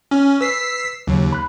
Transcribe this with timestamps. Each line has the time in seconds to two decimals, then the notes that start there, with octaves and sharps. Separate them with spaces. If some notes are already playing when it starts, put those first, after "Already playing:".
0.11 C#4
0.41 B4 E6 B6 C7
1.07 D#2 C#3 F#3
1.32 B5 F#6